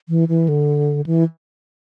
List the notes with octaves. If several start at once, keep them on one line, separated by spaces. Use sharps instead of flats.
E3
E3
D3
E3